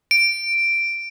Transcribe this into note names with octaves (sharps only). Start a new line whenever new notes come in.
D7